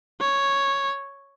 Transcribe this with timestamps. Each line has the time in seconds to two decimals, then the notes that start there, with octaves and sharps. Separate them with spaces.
0.21 C#5